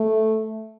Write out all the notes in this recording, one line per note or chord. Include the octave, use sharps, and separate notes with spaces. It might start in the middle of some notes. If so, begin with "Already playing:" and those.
Already playing: A3